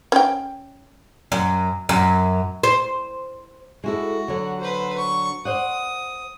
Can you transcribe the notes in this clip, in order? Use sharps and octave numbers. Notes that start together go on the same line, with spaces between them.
C#4 G5
F#2
F#2
C5
G#3 E4 F#4 A4
D3 F#3
B4 C5
C#6
C5 D5 F#5 D#6